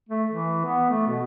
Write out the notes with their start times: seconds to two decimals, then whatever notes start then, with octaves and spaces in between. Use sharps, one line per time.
0.09 A3
0.31 E3
0.65 B3
0.90 A3
1.08 B2